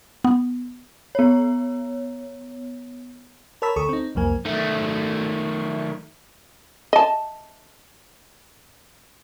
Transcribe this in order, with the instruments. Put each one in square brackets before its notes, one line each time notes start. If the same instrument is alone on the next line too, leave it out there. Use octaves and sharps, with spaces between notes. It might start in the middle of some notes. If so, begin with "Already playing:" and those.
[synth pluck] B3
[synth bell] B3 C#5
[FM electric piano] A#4 C#5 A5 B5 E6 B6
D2 A4 C#6 D#6
C4 D#4
C2 F2 A#3 G#5
[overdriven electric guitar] D#3 A3
[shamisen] D#5 A5